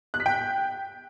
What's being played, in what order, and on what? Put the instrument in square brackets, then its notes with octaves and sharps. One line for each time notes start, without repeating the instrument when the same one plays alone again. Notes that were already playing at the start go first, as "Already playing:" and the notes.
[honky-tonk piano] F#6
B6
G5